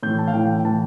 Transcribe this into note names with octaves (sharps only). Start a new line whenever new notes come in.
A2 E3 G6
A5
F5
A2 E3 G5
A2 E3 A5